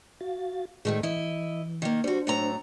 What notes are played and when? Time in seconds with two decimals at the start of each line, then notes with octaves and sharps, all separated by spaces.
0.21 F#4 F5 A6
0.85 D2 A2 D#3 G#3 A3 G#4
1.03 E3 E4 D#5
1.82 D#3 A#3
2.04 G3 D4 F#4 C5
2.27 A2 F#3 A#5